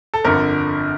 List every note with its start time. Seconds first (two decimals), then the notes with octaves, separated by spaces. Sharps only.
0.14 A4
0.24 G1 F2 D3 A#4